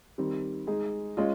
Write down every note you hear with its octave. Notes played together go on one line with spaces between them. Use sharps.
D#3 G3 C4
G#3 D#4 G#4
G#3 C#4 F4